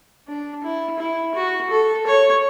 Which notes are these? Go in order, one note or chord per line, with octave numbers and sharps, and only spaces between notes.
D4
E4
E4
F#4
A4
C#5